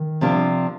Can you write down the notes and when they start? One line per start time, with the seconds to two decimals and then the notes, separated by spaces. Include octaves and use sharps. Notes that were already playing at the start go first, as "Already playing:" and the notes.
Already playing: D#3
0.21 C3 F3 A#3 D4